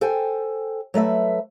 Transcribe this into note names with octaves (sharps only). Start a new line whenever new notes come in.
A4 C5 G5 G#5
F#3 A3 B4 E5